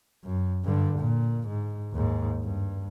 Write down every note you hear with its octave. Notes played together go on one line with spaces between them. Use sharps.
F#2
G2 D3
A#2
G#2
D#2 G#2
G2